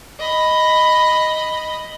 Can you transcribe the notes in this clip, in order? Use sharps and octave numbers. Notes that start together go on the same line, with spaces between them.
D#5 B5